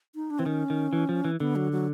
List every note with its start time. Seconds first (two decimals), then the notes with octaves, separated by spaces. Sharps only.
0.15 D#4
0.30 D4
0.39 E3 C4
0.46 D#3 C#4
0.70 D#3
0.93 E3
1.09 F3
1.25 E3
1.40 D3 B3
1.56 F#3
1.72 F#3